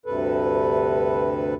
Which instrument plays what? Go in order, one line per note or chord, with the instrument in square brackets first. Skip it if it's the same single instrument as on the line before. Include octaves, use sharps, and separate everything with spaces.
[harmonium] D2 G2 C3 A4 B4